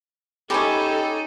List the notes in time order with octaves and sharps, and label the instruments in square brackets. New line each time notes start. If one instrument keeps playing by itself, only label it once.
[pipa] G#3 A3 C#4 [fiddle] D#4 [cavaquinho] G4 B5 [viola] A4